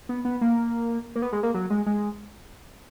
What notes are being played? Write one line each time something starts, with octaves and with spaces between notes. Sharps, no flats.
B3
B3
A#3
A#3
B3
G#3
A#3
F#3
G#3
G#3